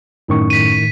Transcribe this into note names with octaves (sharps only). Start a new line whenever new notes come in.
F#2 A2 D#3 C#4 C#6
B6 D#7